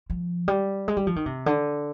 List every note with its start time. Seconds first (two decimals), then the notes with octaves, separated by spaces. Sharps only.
0.10 F3
0.48 G3
0.88 G#3
0.97 G3
1.07 F3
1.16 D#3
1.26 C3
1.46 D3